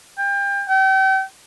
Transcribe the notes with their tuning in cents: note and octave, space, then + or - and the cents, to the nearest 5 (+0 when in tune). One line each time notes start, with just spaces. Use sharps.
G5 +30
G5 -40